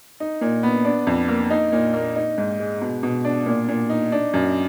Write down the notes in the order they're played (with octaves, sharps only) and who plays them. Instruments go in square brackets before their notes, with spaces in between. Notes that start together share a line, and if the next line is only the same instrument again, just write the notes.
[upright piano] D#4
A#2
B3
D4
F2
A#3
D#4
A#2
A#3
D#4
G#2
G#3
B2
B2
D4
A#2
A#2
D#4
D4
F#2